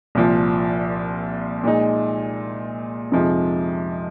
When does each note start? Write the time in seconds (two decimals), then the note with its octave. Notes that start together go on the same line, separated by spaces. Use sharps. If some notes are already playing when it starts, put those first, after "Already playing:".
0.15 C2 A#2 F3
1.64 A#2 G#3 D#4
3.12 F2 C3 F3 G#3 D#4